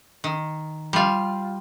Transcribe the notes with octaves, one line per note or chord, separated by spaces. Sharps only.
D#3
G3 F4